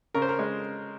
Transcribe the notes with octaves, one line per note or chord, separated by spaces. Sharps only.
C#3 A#4
C5
A#4
G#3